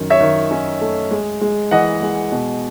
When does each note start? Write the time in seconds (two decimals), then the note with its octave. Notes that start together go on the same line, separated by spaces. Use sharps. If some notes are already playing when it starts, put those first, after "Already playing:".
Already playing: F#2 D#3
0.10 C#5 E5
0.21 D#3
0.51 C#4
0.81 A3
1.11 G#3
1.41 G#3
1.71 E3 D#5 F#5
2.02 G#3
2.32 B2